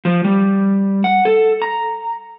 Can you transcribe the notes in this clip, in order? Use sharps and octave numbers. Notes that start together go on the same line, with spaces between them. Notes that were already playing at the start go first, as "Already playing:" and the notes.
F3
G3
F#5
A4
A#5